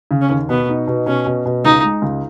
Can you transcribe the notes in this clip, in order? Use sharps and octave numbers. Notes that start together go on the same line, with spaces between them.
C#3
C#4
D#2
B2 B3
D#4
B2
B2 C#4
B2
B2
C#2 D#4
G#3
C#2